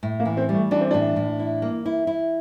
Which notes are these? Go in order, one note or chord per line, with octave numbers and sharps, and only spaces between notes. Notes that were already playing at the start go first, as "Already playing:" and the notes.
A2
A#3
E3
C4
G3
A3
E3 D4
C4
A2 D4
A2
E4
A#3
E4
E4